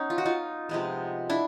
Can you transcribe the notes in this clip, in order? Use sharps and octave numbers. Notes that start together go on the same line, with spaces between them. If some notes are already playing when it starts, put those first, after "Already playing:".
Already playing: B3 C#4 D#4
F4
F#4
D#4 F4
C3 F3 G#3 B3
D4 E4